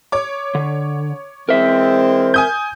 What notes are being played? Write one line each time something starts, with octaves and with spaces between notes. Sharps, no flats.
C#5 D6
D3
E3 G#3 C4 A#4 E5
G#5 D#6 G6